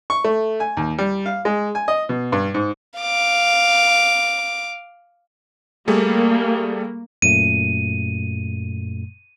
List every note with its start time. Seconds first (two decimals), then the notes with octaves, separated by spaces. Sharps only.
0.10 C#6
0.24 A3
0.60 G#5
0.77 D#2
0.98 G3
1.26 F5
1.45 G#3
1.75 G#5
1.88 D#5
2.09 B2
2.32 G2
2.54 G#2
3.00 F5 D6
5.88 G3 A3 A#3 G#4
7.22 F#2 A#2 A3 D#7